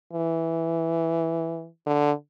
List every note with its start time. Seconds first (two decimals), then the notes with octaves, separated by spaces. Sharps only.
0.13 E3
1.86 D3